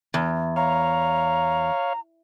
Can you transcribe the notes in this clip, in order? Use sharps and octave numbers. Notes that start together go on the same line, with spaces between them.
E2
C#5 F5 A#5